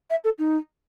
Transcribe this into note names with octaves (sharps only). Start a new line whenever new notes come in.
E5
A4
D#4